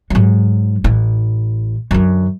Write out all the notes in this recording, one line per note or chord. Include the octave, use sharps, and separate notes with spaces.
G#2 F#3
A1 E4
F#2 D3